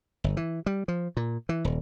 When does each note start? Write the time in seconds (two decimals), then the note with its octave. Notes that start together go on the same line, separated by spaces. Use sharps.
0.24 G1
0.37 E3
0.66 G3
0.88 F3
1.17 A#2
1.49 E3
1.65 D#1